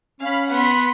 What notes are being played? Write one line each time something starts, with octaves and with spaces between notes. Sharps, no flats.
C#4 F5 B5
B3 B4 F#5 C6 B6